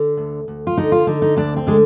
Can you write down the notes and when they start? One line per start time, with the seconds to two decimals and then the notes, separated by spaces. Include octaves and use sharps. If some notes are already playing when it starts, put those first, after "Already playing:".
Already playing: D3
0.17 D2
0.48 D2
0.67 F4
0.77 D3 D#4
0.92 F4
1.07 D3 D#4
1.22 D#4
1.36 D2 D4
1.56 C4
1.67 D3 G#3